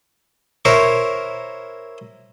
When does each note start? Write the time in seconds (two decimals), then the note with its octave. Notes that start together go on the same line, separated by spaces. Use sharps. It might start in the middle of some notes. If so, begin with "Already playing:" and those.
0.65 E4 A#4 C5 C#5